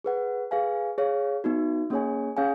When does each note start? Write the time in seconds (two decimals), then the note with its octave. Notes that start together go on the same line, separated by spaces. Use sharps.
0.04 G#4 B4 F#5
0.51 G#4 B4 F5 G#5
0.98 G#4 C#5 F5
1.44 B3 D#4 F#4
1.90 A#3 C#4 G#4 C#5 G#5
2.37 C#4 G#4 C#5 F5 G#5